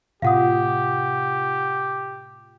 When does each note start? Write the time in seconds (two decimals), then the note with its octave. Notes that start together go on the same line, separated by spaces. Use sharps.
0.22 A2 C3 F4 G4 F5 F#5 D#6